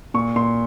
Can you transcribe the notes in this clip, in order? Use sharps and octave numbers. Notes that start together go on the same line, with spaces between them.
A#2 C#6
A#2 C6